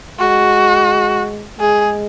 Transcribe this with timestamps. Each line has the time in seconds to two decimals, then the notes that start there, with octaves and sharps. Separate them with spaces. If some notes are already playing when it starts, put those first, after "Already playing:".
0.20 G#3 F#4
1.60 G#3 G#4